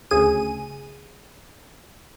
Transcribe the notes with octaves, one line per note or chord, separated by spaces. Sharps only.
D2 C#3 G#4 D#7